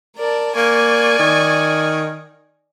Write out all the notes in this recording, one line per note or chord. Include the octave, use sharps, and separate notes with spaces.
A#4 D5 A5
A#3 D5 G#5 C#6
D#3